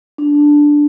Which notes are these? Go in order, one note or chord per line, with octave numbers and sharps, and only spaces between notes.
D4